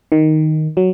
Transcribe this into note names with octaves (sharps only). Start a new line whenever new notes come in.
D#3
F#3